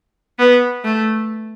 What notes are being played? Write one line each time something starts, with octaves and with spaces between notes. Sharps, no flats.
B3
A3